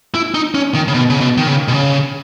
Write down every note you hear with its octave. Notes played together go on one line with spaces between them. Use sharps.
E4
D#4
C#4
D#3
C#3
B2
C#3
B2
D#3
C#3
B2
C#3